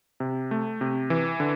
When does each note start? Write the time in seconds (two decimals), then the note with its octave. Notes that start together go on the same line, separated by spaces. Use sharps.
0.20 C3
0.51 A3
0.81 C3
1.10 E3
1.40 D3